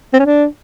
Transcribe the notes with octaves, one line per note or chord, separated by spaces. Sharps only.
C4
C#4
D4